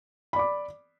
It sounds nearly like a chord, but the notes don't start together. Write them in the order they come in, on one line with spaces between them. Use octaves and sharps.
B5 D5 D6